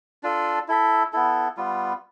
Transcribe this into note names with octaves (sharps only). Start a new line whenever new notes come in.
D4 F4 A4
E4 A4 E5
B3 E4 A4
G3 B3 F4